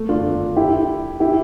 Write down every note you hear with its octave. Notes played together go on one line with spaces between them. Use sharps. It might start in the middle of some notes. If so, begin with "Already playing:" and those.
Already playing: A3
D4 F4
E4 G4
E4 G4